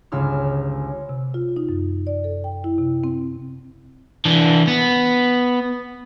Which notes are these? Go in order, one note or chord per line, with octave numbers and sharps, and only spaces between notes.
G1 C#2 C#3 E6 F6
C3
F4
D#4
F#2
D5
A4
G5
E4
C3
C4
E3 D4
B3